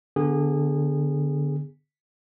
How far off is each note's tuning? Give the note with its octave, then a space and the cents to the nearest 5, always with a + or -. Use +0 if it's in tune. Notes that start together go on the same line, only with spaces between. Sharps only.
D3 +0 B3 +0 G#4 -25